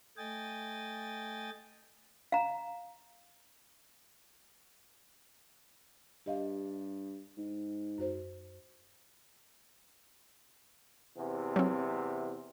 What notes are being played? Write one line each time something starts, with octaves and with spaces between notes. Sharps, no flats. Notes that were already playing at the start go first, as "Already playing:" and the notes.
A3 D#5 G5 G#5 A6
F5 A#5
G2 G4 D#5 F5
G#2
F#2 F#4 C5
E2 C3
F#3 C4